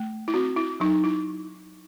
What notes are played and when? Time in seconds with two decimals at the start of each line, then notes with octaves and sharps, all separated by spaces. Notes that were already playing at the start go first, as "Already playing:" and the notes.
Already playing: A3
0.28 E4
0.34 C4 F#4
0.57 E4
0.80 F#3 D#4
1.04 E4